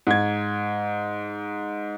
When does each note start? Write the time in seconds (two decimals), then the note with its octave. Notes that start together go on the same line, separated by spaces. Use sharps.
0.07 G#2 G#6